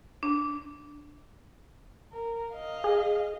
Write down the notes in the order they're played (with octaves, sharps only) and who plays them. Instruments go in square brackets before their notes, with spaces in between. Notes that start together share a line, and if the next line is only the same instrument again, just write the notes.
[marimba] D4
[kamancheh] A#4
D#5 F5
[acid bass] G#4